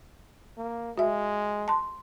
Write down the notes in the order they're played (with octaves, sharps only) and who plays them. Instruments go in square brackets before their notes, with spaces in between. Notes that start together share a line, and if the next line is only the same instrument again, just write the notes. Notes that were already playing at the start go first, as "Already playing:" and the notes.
[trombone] A#3
[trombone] G#3 [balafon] F#4 E5
[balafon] A5 C6